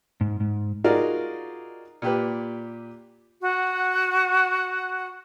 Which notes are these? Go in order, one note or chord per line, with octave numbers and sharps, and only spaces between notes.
G#2
G#2
D#4 F4 F#4 G#4 A#4 D5
A#2 G4 B4
F#4 F#5